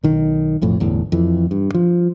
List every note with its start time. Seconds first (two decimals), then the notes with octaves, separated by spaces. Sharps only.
0.03 B1 D#3
0.61 B1 F2 A2
0.80 G1 E2 A2
1.12 F2 E3
1.51 G2
1.74 F3